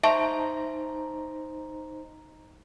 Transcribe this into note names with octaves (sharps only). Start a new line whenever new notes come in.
D#4 C5 E5 A5 A#5 C#6